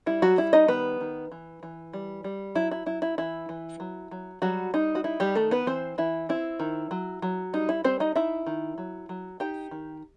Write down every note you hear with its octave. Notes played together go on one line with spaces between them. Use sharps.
G3 E4
F#3 F#4
G3 E4
D#4 D#5
D#3 B3 B4
D#3
E3
E3
G3
G3
F#3 E4
E4
F#3 E4
E4
E3 E4
E3
F#3
F#3
F#3 G3 F#4
G3 D#4
F#4
D#4 E4
G3 G4
D#3 A3 A4
B3 B4
E3 C4 C5
E3 E4
C4 E4
D#3
F#3
F#3
G3 D#4
E4
G3 C4 C5
D#4 D#5
D#4 E4 E5
D#3
F#3
F#3
D#4 G4 G5
D#3